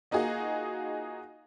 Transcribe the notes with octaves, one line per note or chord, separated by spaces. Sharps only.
A#3 D#4 F4 F#4 G#4